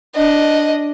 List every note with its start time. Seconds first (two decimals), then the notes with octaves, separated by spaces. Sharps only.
0.15 D4 D#5